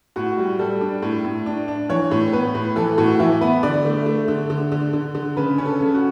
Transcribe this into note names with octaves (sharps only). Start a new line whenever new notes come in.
A2 F#4
G3
G3 A4
D4
A2
A2
D4
D4
E3 C#5
A2
B3 B4
A2
E3 A4
A2 F#4
E3 E4
B3 B4
D3 D5
A3
A3
D3
D3
D3
D3
D3
C#3 B4
C#4
A4
C#3
F#4